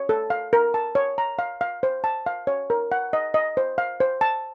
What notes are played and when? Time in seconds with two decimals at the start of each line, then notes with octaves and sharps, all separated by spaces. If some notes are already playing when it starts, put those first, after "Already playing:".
Already playing: C#5
0.09 A4
0.30 F5
0.53 A#4
0.74 A5
0.95 C#5
1.18 A#5
1.39 F5
1.61 F5
1.83 C5
2.04 A5
2.26 F5
2.47 C#5
2.70 A#4
2.92 F#5
3.13 D#5
3.34 D#5
3.57 C5
3.78 F5
4.00 C5
4.21 A5